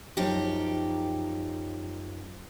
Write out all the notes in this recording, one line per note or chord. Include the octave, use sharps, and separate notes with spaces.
F#2 F3 D#4 G4